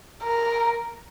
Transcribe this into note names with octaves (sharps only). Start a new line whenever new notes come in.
A#4